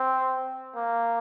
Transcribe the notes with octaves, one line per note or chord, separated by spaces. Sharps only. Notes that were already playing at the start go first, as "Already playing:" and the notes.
Already playing: C4
A#3